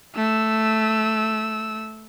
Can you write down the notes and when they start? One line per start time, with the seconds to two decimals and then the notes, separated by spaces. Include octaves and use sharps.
0.16 A3 E6